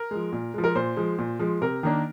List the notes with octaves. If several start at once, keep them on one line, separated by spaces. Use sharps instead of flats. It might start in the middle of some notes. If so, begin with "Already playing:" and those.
Already playing: A#4
F3 G#3
A#2
F3 G#3
A#4
A#2 C5
F3 G#3
A#2
F3 G#3
C3 A#4
D#3 A#3 D4